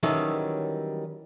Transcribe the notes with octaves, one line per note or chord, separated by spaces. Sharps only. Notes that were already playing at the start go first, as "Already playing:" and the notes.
D#3 E3 F#3 G3 C#4 A4